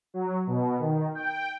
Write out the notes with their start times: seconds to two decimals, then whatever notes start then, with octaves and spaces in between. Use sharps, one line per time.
0.14 F#3
0.47 B2
0.79 D#3
1.15 G5